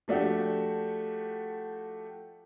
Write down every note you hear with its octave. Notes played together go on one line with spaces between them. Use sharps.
F3 A3 D4 F#4 G4